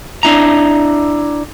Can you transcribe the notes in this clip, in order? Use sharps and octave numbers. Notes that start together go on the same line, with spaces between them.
D4 E4 A#5